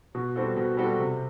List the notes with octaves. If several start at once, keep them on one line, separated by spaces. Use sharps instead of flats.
B2
G3 C4 F#4 A4
B2
G3 C4 F#4 A4
C3